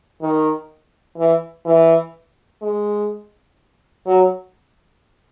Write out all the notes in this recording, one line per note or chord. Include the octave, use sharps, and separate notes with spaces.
D#3
E3
E3
G#3
F#3